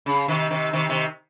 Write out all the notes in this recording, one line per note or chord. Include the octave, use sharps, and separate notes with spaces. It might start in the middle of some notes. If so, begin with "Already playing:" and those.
C#3
C3 D#3
C3 D#3
C3 D#3
C3 D#3